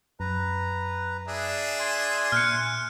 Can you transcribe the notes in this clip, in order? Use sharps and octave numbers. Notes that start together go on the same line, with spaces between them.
F#2 B4 A#5
D4 G#4 E5
G#5 C6
A#2 F6 F#6 C#7